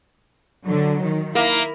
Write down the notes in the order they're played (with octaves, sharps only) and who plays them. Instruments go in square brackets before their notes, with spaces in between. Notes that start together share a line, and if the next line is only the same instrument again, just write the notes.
[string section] D3 F#3
D#3
[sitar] A#3 [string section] E4